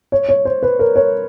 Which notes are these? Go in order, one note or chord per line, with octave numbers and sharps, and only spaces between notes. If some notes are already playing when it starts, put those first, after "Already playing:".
C#5
C#5
C5
B4
A#4
C#5